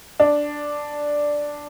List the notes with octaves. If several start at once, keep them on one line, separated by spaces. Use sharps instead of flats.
D4